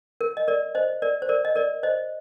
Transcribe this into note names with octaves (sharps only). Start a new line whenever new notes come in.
A#4
D#5
A#4 D5
C5 D#5
A#4 D5
C5
A#4 D5
D#5
A#4 D5
C5 D#5